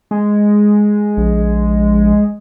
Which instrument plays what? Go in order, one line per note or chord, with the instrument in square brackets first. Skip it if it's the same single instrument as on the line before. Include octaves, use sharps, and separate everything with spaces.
[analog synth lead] G#3
[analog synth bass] A#1